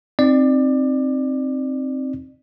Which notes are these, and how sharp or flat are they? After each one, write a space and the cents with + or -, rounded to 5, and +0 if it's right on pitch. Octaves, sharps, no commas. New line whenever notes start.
C4 +10 D#4 +0 D5 +25